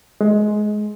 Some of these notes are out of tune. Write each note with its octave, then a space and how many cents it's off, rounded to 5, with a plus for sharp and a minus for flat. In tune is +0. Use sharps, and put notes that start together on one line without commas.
G#3 +20